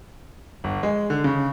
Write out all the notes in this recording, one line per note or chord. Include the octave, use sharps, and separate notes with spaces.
G1
G#3
D3
C#3